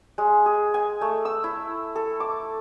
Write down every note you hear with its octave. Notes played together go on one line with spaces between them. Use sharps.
G#3
G#4
G#5
A3
E6
E4
A4
D6